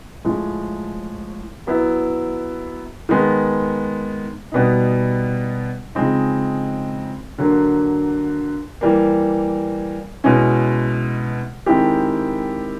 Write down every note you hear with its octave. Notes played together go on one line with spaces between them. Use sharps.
A2 F3 G#3
F#3 B3 E4
D#3 G#3 B3
B2 G3 B3 D#4
C#3 F3 G#3 C4 D#4
D3 F#3 A#3
E3 G3 A#3
B2 G#3 C#4 E4
D#3 G#3 C4 E4 G4